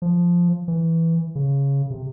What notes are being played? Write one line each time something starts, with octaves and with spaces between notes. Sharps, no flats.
F3
E3
C#3
C3